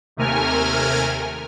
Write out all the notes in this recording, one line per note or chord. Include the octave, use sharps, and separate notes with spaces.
D#2 C3 A3 A#4 G#5 F6